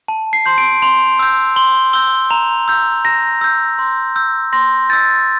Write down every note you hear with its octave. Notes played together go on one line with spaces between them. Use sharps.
A5
C7
C6 G6
D7
C6 F7
E6 G6
C6 G7
E6 G6 G7
A#5 F7
E6 G6
A#5 A#6
E6 G6
C6
E6 G6
C6 A#6
E6 G6 A6